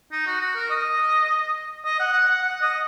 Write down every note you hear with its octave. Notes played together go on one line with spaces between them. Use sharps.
D#4
F#4
F#4
A#4
D#5
D#5
F#5
F#5
F#5
F#5
D#5